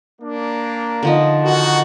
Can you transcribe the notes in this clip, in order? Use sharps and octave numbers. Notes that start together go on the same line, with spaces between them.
A#3 D4
D3 F3 D#4
D#3 F#4